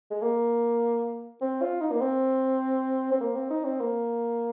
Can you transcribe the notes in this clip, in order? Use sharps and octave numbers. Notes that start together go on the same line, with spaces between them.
G#3
A#3
C4
F4
D#4
A#3
C4
C4
A#3
C4
D#4
C4
A#3